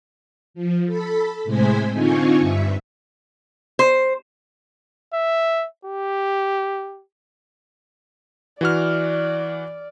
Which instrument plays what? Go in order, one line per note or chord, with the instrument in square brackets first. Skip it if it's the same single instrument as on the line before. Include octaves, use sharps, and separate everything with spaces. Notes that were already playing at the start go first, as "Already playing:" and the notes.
[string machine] F3
A4 B5
A2 C3 G#3 C5 G#5 B6
D3 C4 D#4 F4 G#5 C#6
G2 E5
[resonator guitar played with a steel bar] C5
[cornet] E5
G4
[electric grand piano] E3 F#4 F6 [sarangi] D5